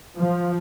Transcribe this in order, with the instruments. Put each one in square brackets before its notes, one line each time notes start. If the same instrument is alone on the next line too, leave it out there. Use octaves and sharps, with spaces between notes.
[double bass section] F3